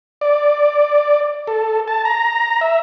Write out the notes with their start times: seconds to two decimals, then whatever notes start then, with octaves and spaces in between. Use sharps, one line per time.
0.21 D5
1.47 A4
1.88 A5
2.05 A#5
2.61 E5